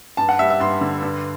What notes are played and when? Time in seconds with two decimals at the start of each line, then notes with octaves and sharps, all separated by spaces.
0.17 G2 A5
0.29 F#5
0.39 G3 E5
0.50 E5
0.60 G2 C6
0.81 D3
1.02 G2